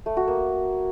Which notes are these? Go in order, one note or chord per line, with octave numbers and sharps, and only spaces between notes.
A3
F#4
A#3